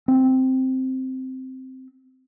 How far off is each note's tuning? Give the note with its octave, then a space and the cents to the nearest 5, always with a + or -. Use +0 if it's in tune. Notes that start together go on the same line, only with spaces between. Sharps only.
C4 -5